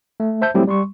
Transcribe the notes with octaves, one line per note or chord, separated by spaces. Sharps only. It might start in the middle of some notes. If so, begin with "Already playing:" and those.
A3
C5 E5 A5 G6
F#3 G3 A3 C4 E4 G4
G3 C6 C#6